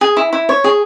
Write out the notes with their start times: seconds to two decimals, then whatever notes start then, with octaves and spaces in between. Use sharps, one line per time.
0.01 G#4
0.17 E4
0.33 E4
0.49 C#5
0.64 G#4